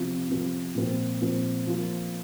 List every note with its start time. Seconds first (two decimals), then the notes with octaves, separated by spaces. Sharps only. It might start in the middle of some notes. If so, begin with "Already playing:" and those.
Already playing: C3 F3 C4 F4
0.29 C3 F3 C4 F4
0.75 A#2 F3 C4 F4
1.21 A#2 F3 C4 F4
1.67 F3 A#3 F4